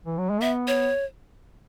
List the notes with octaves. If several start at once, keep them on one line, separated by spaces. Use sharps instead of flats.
E3
F#3
G#3
B3 E5
C#5